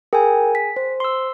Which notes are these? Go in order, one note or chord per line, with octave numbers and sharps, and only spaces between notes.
G#4 A#4 G5 G#5
B6
C5
C6 E6